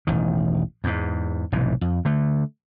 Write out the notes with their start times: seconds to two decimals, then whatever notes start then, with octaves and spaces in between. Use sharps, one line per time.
0.07 E1 A1 D#3
0.84 E2 G#2
1.52 F1 B1 G#2 E3
1.81 F2
2.05 D3 A3